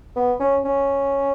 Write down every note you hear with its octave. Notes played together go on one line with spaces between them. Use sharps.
B3
C#4
C#4